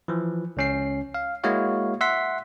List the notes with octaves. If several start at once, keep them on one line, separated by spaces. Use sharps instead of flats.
E3 F3
C#2 C#4 C7
F5
G#3 A#3 E4 F#4 C#5 F5
E5 F#5 C6 B6